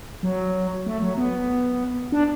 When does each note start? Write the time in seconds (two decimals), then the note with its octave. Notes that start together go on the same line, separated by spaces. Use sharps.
0.23 F#3
0.86 A3
1.02 F#3
1.17 B3
2.12 D4